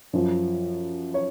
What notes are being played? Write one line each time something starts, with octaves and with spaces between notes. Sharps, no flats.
F#2 F3
C#5